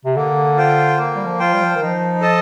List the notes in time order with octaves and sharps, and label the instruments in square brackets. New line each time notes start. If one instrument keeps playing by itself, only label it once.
[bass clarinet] C3
[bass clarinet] D3 [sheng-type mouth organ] A#3
[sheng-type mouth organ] F4 C5 G5
A#3
[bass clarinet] G3
F3
[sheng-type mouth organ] F4 C5 G5
[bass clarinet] G3
F3
D#3
[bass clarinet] F3 [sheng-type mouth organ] D#4
[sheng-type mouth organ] A4 D#5 A5